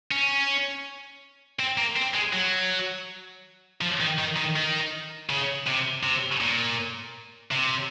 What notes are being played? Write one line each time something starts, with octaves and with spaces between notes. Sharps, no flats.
C#4
C4
A#3
C4
G#3
F#3
F3
D#3
D#3
D#3
D#3
C#3
C3
C3
A#2
C3